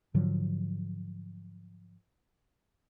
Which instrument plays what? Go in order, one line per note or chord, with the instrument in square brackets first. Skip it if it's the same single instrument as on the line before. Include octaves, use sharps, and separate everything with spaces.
[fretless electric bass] G#2 D3 F3 F#3